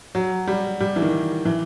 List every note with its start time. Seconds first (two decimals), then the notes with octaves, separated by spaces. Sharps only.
0.15 F#3
0.47 G3
0.80 G3
0.96 E3
1.02 D#3
1.45 E3